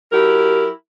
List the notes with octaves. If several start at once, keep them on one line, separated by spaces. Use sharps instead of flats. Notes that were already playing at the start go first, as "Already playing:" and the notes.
F#3 E4 G4 A#4